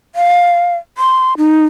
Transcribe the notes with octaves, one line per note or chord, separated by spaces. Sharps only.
F5
C6
D#4